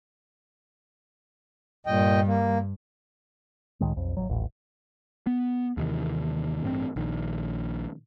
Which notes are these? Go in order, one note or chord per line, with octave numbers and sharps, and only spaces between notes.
G2 A#2 G3 D#5 G5
A#3
C#2 A2 D#3 G#3
B1 F2
G#1 D#2 F#3
D#1 A1
B3
D#2 C3 D#3 E3
A1 G2 B3 C4
A#1 D#3